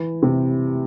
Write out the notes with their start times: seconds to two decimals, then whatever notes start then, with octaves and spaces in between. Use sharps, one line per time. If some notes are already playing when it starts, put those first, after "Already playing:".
Already playing: E3
0.22 C3